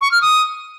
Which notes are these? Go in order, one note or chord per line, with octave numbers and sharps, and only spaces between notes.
C#6
F6
D#6